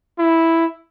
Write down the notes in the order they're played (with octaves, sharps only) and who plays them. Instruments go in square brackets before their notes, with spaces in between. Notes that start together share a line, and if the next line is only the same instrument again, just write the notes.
[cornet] E4